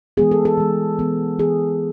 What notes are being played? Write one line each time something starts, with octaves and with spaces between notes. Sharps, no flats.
E3 G#3 B3 G#4
A4
A4
E3 G#3 B3
E3 B3
E3 B3 G#4